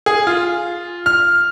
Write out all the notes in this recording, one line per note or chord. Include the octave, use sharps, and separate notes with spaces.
G#4
F4
F6